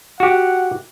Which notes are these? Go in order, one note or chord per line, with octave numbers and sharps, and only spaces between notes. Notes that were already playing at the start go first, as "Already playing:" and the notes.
F#4 G4 F#5